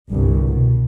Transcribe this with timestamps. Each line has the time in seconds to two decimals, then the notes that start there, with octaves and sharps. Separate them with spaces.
0.12 G1 C2 G2
0.47 B2